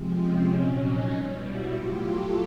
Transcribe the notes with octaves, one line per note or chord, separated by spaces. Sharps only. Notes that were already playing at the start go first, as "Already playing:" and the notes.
Already playing: C3 F3 G#3 C4
C#4
A#2 F#3
C#4 D#4
B2 G3
E4 F#4
A2 F#3 F4 G4
G4 A4